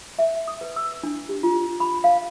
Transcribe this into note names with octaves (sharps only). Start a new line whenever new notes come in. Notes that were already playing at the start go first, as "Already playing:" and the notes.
E5
D#6
B4
E6
D4
G4
F4
B5
F5